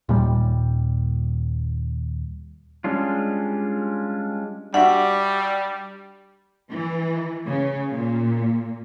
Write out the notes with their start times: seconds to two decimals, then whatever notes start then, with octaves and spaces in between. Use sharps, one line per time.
0.09 D#2 A#2 G3
2.84 G3 G#3 C#4 D4 F4
4.74 G3 D4 F#4 E5 F#5
6.72 E3
7.47 C#3
7.94 A#2